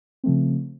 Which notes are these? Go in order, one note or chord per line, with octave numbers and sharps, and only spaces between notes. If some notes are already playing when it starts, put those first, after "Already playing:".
C#3 F3 A3 C4